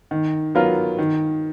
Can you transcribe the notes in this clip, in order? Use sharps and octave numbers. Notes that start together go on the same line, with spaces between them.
D#3
F#3 B3 F4 A#4
D#3